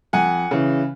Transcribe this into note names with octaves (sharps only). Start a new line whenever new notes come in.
F2 F#5 G#5
C#3 E3